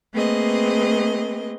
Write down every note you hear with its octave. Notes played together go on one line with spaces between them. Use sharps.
A3 A#3 C4 G#4 B4 D#5